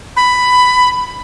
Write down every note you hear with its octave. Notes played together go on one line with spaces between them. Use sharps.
B5